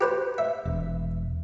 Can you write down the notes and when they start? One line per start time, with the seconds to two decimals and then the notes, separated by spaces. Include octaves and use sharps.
0.01 G4 B4 C5
0.38 E5
0.65 E1